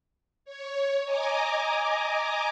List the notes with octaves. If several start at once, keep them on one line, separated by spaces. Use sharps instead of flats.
C#5
D#5 G#5 A#5 D6